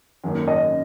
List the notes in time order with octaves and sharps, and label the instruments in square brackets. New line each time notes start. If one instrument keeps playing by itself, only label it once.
[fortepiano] G#1 F#2 D#3 A#3
[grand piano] D#5